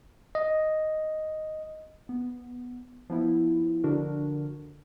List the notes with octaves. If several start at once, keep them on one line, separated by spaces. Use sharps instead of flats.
D#5
B3
F3 B3 E4
D3 F3 D4 F#4 A#4